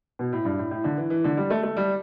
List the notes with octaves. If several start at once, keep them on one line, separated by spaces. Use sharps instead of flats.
B2
A2
G2
A2
A2
D3
E3
E3
D3
G3
A3
A3
G3